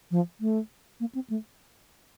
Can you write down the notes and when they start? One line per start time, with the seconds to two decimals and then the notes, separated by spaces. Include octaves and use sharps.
0.11 F3
0.41 A3
1.00 A#3
1.15 C4
1.30 A3